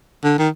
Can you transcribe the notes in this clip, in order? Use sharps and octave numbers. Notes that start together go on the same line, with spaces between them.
D3
D#3